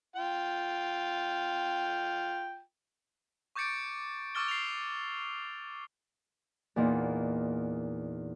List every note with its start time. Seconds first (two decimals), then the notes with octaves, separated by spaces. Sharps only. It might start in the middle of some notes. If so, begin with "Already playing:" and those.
0.16 F4 G5
3.56 C#6 D6 G6 A6 C#7 D7
4.35 C#6 D6 E6 F6 A6 G7
4.48 C7 F7
6.76 E2 A#2 D#4